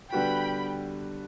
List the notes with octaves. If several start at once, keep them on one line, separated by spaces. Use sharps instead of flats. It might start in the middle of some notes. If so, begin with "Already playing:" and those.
D3 G3 B3 F#4 G5 B5